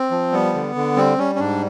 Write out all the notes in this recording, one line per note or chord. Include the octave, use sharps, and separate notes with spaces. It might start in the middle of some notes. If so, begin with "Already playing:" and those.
Already playing: C4
F3
G3 B3
D3
D3
G3 C4
G3 C#4
C#4
G#2 D4